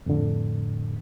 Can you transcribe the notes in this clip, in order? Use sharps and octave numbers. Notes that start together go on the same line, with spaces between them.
F2 A2 D3